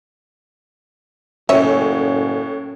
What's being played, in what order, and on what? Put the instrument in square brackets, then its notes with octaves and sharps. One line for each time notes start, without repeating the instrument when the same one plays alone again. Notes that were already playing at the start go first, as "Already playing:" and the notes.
[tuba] F#1 [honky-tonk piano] A2 C#5 [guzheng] C#4 [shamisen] E5